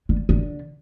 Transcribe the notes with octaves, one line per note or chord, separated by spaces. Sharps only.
D3
D3